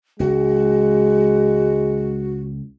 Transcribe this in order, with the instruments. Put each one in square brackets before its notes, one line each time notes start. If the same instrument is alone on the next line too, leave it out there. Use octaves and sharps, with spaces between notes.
[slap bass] C#2 [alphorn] G#3 [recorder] F#4